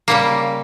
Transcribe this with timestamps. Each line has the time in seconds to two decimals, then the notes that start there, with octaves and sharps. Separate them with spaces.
0.08 C#3 G3 A#3